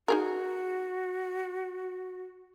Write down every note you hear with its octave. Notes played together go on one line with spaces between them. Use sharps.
D#4 F#4 G#4 A#4